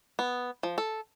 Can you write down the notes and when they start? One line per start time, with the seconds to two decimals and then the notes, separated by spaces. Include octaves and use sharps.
0.19 B3
0.63 F3
0.78 A4